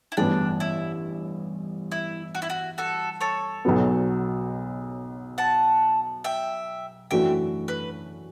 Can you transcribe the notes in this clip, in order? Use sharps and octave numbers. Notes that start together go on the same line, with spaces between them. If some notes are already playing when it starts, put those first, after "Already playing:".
E4
A1 G2 E3 B3 D4
E4
E4
F#4
E4
F#4
F#4 A4
A4 C#5
B1 B2 F#3 B3
F#5 A5
E5 G5
F#2 E3 A3 D4 F#4 E5 G5
B4